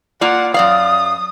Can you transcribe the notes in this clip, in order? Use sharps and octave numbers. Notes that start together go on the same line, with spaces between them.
A#3 F4 D5 F#5
F#2 D5 F5 D#6